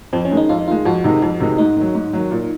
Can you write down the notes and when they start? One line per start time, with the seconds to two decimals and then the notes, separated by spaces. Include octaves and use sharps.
0.13 F2 C4
0.25 C#4
0.31 D#3 G#3
0.37 D#4
0.49 F2 F4
0.59 D#4
0.68 D#3 G#3 F4
0.85 F2 F#4
1.04 C3 D#3 G#3 D#4
1.22 F2
1.40 C3 D#3 G#3 D#4
1.58 G#2 D#4
1.76 D#3 F#3
1.95 G#2
2.13 D#3 F#3
2.31 A#2